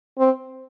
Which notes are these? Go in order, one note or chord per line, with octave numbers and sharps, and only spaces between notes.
C4